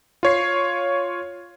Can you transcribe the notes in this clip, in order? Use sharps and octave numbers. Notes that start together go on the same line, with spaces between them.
F4 C#5 C7